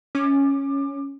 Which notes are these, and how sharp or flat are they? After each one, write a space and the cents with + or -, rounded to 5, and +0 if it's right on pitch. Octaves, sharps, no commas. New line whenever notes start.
C#4 +0 D6 +25